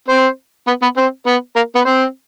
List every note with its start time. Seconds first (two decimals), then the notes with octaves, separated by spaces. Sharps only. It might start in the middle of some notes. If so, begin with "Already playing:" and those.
0.09 C4 C5
0.67 B3 B4
0.82 B3 B4
0.97 C4 C5
1.26 B3 B4
1.55 A#3 A#4
1.75 B3 B4
1.85 C4 C5